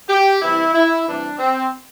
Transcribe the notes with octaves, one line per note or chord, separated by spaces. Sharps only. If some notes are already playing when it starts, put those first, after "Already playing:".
G4
C3 E3 G3 E4
E4
C3 E3 G3 D4
C4